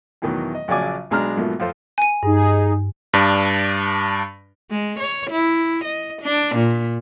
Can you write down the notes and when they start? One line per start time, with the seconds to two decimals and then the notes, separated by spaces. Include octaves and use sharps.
0.22 E2 B2 D#3 E3 F#3
0.55 D#5
0.68 A#1 C#3 F#3 D5 G#5 D6
1.10 B1 B2 G#3 D4 A#5 F6
1.37 G#2 B2 F3 F#3 A3 A#3
1.60 F2 F4 A4 C5
1.98 G#5 D#7
2.23 G2 D#4 G#4
3.14 G2 D4
4.71 G#3
5.00 C#5
5.31 E4
5.85 D#5
6.22 D4
6.56 A#2